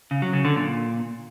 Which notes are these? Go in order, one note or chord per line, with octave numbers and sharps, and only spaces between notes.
C#3
F#3
C#3
D3
A#2